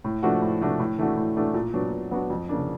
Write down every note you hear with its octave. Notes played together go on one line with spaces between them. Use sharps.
A2
F3 A3 D4 F#4
A2
F3 A3 D4 F#4
A2
E3 A3 D4 F#4
A2
E3 A3 D4 F#4
A#2
F#3 B3 D4 F#4
A#2
F#3 B3 D4 F#4
F2
C#3 F3 A#3 D4